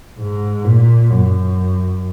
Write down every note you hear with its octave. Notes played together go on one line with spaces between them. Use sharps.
G#2
A#2
F#2